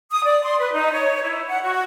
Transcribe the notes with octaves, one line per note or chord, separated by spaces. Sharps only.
D#6
D5
C6
B4
D#4
C#5
E4
F#5
F#4